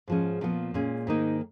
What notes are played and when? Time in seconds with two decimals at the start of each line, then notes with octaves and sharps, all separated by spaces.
0.08 G#2 F3 G#3 C#4
0.41 A#2 F3 B3
0.74 A#2 G#3 C#4
1.07 G#2 D#3 A#3 D#4